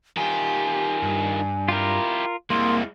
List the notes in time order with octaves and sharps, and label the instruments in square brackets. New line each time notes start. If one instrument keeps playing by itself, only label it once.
[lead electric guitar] D#3 F4 [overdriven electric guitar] G4 [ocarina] G#5
[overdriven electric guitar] G2
[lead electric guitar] E4 G4 [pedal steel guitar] F4 A#4
[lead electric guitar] C2 [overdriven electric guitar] G#3 E4 [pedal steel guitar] A#3 [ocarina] C6